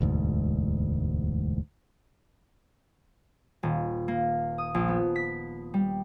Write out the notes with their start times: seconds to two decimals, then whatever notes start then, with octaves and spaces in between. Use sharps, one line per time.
0.01 E1 D2 G#2
3.63 D#1
4.08 A#3
4.58 D#6
4.74 A#1
4.88 B3
5.16 B6
5.74 G3